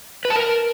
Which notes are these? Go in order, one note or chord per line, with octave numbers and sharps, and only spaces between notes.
B4
A5
A#4